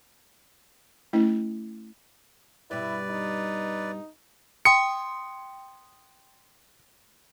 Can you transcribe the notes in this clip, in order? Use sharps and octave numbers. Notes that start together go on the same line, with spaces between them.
A3 C#4 E4
G2 B2 E4 B4 D5
D#4
G5 C6 D#6 C#7